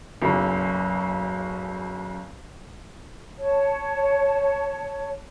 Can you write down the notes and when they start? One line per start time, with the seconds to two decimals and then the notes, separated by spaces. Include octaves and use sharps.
0.22 F#1 B1 C#3
3.38 C#5 A5